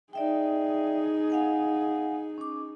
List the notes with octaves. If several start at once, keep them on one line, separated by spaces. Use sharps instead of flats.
D#4 G#4 D5 E5 G5
F5 F#5 G#5
C#4 D6